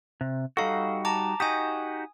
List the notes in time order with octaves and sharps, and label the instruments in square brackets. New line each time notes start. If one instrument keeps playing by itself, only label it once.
[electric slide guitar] C3
[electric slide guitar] G3 D#4 F#4 [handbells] A4 F5
[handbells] A5 A#5 D6
[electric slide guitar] D#4 F#4 G4 [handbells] G#5 D#6